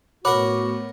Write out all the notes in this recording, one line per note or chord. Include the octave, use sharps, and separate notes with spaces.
A2 B3 F#4 A#4 C#5 F#5 B5 D6